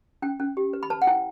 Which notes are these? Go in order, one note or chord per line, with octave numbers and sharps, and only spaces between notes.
C#4 G5
C#4
G4
B4
B5
B4 A5
F#5
E4 G5